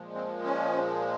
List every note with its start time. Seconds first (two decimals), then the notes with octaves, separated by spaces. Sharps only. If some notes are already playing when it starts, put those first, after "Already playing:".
Already playing: A#2 F3 G#3
0.15 C4
0.45 C#4